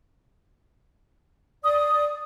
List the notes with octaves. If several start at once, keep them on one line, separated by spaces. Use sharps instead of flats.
D5 D#6